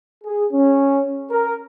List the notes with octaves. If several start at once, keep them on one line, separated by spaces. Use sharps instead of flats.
G#4
C#4
A#4